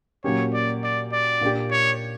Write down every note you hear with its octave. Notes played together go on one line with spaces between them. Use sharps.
A#2 F#3 A#3 C#4 G4 C#5
D5
D5
D5
A#2 A#3 D4 G4
C#5